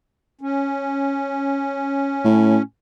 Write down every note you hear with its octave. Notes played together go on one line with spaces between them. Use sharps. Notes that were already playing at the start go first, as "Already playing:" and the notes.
C#4
A2